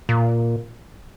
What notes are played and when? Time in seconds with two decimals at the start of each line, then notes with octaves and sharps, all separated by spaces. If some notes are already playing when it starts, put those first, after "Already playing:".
0.09 A#2